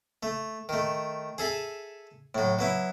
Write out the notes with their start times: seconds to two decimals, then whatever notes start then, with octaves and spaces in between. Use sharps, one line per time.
0.23 A3
0.69 D#3 A3
1.38 G#4 A4 E5 G#5
2.35 A2 F#3
2.59 F#3 B3 E4